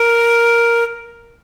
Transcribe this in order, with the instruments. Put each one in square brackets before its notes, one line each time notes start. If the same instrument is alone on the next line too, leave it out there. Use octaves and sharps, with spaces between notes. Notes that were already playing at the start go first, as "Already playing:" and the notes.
Already playing: [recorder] A#4